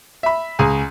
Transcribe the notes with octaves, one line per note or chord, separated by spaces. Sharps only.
E5 B5
C#2 G#4 G#5 A#5